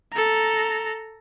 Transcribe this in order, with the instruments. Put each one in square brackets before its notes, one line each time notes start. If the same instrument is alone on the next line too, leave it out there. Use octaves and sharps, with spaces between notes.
[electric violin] A4 A#5